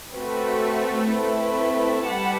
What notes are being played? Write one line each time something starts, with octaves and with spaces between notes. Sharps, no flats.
A3 C4 F#4 B4
A3 C4 E4 B4
G3 G4 B4 F#5 A5